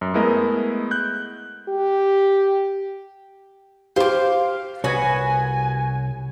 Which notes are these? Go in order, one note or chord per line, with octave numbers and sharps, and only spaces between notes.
F#2
G#3 A3 B3 E4 A#4 D#5
F#6 G6
G4
G4 C5 F5 D6
C2 B3 F#4 C#5 G#5